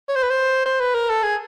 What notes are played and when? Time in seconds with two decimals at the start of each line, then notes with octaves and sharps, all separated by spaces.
0.09 C#5
0.16 C5
0.23 B4
0.30 C5
0.65 C5
0.80 B4
0.94 A#4
1.10 A4
1.23 G#4